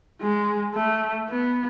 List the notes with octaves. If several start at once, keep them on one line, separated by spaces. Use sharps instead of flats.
G#3
A3
B3